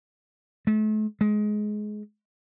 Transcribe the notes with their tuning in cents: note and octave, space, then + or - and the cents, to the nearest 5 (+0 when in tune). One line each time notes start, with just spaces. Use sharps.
A3 -40
G#3 +20